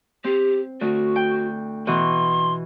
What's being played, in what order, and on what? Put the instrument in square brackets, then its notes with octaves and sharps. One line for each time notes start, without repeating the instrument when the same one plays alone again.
[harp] C4 [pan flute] G4
[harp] D2 [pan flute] F#4
[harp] G5
[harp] B2 E3 C#6 [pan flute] C6